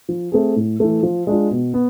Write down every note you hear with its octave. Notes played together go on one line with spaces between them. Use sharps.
F3
A3 C4 G#4
A2
E3 A3
F3
G#3 D4 F4
B2
B3